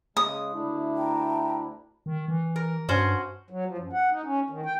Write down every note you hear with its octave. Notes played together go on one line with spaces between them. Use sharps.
C#3 G#3 D#6
D2 D4 E4
G5 A5 A#5
D#3
E3
A#4
G2 C#4 F#4 C5
F#3
F3
F#2
F#5
D#4
C#4
D#3
G5